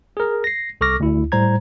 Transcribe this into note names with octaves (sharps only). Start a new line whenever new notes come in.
G#4 A#4
A#6 C7
C2 A4 C#6 D6 F6 A#6
D2 E4
A2 G3 C5 A#5 G#6